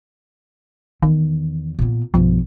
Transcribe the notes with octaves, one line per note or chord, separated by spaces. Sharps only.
E2 D#3
A#2 B3
B1 G2 F3